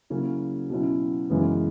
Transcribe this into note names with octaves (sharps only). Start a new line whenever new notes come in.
C#3 F#3 A#3 C#4 E4
B2 F#3 C#4 E4
F#2 C#3 E3 G#3 B3